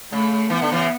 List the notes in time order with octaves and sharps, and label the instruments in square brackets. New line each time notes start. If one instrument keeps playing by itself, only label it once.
[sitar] C#3 [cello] A3
[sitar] E3 [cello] B3
[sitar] D3
C#3 E3